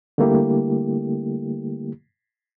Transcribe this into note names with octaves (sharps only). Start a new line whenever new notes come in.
D3 G3 A3 A#3 E4 G4